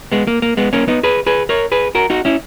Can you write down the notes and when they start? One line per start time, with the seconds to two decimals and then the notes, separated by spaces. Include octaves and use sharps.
0.12 G#3 B3
0.27 A#3
0.42 A#3
0.57 G#3 B3
0.73 A#3 C#4
0.88 B3 D#4
1.03 G#4 B4
1.27 G#4 B4
1.49 A#4 C#5
1.72 G#4 B4
1.95 F#4 A#4
2.10 D#4 F#4
2.25 C#4 E4